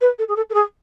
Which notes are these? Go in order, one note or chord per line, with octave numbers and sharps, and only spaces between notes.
B4
A4
G#4
A4
A4
G#4